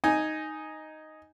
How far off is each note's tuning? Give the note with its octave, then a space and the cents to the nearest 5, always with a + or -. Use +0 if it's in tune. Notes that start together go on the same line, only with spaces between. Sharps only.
D#4 +0 G#5 +0